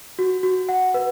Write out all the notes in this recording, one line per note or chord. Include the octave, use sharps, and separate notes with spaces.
F#4
F#4
F#5
B4